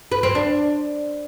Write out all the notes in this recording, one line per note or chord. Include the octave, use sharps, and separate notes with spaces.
B4
C4
D4